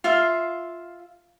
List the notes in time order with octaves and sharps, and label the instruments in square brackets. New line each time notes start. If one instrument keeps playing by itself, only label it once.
[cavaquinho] F4 E5 F5